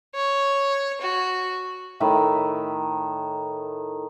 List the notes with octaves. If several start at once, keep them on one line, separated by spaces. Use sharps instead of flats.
C#5
F#4
A2 D#3 E5 B5